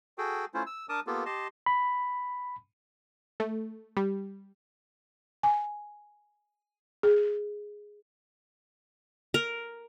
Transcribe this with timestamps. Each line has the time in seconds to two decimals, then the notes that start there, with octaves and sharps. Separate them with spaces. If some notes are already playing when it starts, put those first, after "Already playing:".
0.18 F#4 G#4 A4 G5
0.54 A3 C#4 E4 F4 C5
0.66 E6
0.89 D4 A#4 A5 D6 D#6
1.07 A#3 B3 F4 G4 A4
1.26 G4 D#5 A5 C6
1.66 B5
3.40 A3
3.97 G3
5.43 G#5
7.03 G#4
9.34 A#4